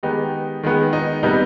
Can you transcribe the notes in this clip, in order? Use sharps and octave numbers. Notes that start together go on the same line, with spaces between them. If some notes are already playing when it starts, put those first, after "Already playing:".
D#3 G#3 B3 D#4 G4
D#3 G#3 B3
D#4
C3 G3 B3 D#4